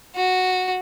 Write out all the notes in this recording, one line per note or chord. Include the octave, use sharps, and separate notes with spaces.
F#4